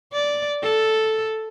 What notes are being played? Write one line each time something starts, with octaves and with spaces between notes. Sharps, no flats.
D5
A4